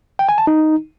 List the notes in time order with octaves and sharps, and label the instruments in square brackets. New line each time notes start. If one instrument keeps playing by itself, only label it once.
[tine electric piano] G5
G#5
A5
D#4